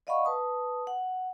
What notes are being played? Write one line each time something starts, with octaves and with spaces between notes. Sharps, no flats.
D5 D#5 F5 F#5 B5 C#6
B4 A5 D#6
F#5